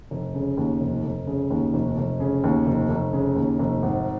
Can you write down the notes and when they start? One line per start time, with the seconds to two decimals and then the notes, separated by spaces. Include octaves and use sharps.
0.11 F1
0.35 C#3
0.57 D#2
0.81 F1
1.04 F1
1.27 C#3
1.50 D#2
1.74 F1
1.97 F1
2.20 C#3
2.44 D#2
2.67 F1
2.90 F1
3.13 C#3
3.36 D#2
3.59 F1
3.82 G#1